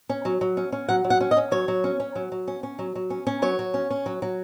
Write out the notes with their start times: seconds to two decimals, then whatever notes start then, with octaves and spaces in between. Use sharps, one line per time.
0.09 C#4
0.25 F#3
0.41 F#3
0.57 C#4
0.72 C#4
0.89 F#3 F#5
1.04 F#3
1.10 F#5
1.21 C#4
1.31 D#5
1.37 C#4
1.51 F#3 C#5
1.68 F#3
1.84 C#4
2.00 C#4
2.15 F#3
2.32 F#3
2.48 C#4
2.63 C#4
2.79 F#3
2.95 F#3
3.10 C#4
3.27 C#4
3.42 F#3 C#5
3.59 F#3
3.74 C#4
3.91 C#4
4.06 F#3
4.22 F#3